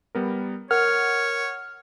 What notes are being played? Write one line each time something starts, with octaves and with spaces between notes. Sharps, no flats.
G3 B3 A#4
A#4 C#5 F#5 F6